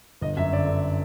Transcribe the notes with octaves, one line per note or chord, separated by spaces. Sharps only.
G1 D#5
F#2 E5
D3 D5
D3